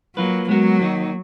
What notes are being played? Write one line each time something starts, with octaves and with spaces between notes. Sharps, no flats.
F#3 A#3 F4 B4
F#3 G#3 B3 F#4 A#4
D#3 A#3 D#4